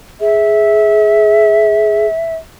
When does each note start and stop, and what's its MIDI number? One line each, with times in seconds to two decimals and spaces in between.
0.20 2.06 68
0.20 2.35 76